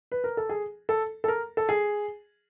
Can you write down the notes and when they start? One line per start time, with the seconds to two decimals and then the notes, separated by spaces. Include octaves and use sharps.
0.12 B4
0.24 A#4
0.37 A4
0.49 G#4
0.89 A4
1.24 A4
1.28 A#4
1.57 A4
1.69 G#4